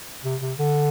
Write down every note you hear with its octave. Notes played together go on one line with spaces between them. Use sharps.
C3
C3
D3